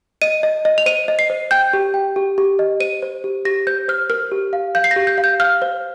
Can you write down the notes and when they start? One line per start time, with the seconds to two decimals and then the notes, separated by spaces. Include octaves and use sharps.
0.22 D#5 D#7
0.43 D#5
0.65 D#5
0.78 F7
0.86 C5 D#7
1.08 D#5
1.19 C7
1.30 C5
1.51 G5 G6
1.73 G4
1.94 G5
2.16 G4
2.38 G4
2.59 D#5
2.80 C5 D#7
3.02 C5
3.24 G4
3.45 G4 A#6
3.67 C5 G6
3.88 C5 F6
4.10 A#4 F6
4.32 G4
4.53 F5
4.75 F5 G6
4.84 C7
4.91 A#6
4.96 G4
5.07 G6
5.18 F5
5.24 G6
5.40 F5 F6
5.62 C5